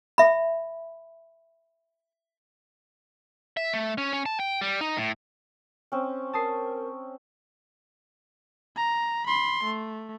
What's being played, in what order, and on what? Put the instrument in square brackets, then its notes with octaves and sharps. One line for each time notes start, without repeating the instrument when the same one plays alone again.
[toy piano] E5 B5
[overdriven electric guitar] E5
A3
C#4
C#4
A5
G5
G3
D#4
A2
[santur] C4 C#4
[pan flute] A#4 [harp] A5 D#6 C7
[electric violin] A#5
B5 C6
A3